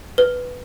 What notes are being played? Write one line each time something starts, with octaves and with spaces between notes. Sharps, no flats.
B4